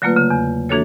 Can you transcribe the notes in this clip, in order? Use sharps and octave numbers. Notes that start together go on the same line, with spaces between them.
D3 F#3 A3 A#3 F4 B4
C#3
E2
E3 A#3 D4 F#4 A4 C#5